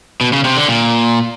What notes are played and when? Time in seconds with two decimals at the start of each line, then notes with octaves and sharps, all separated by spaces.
0.21 B2
0.33 C#3
0.45 C3
0.56 D3
0.68 A#2